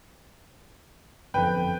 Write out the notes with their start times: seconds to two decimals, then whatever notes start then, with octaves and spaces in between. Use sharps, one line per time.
1.34 G1 F2 B4 G5